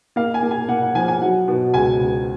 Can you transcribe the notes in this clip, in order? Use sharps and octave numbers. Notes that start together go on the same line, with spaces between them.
A#3 F5
G#5
A#3
G#5
A#3 F#5
F#5
F3 G#5
G#5
F#3 F#5
B2
C#2 G#5
C#2